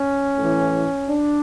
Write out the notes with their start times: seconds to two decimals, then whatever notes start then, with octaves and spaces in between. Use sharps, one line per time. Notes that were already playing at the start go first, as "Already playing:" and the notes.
Already playing: C#4
0.36 A2 E3
1.08 D4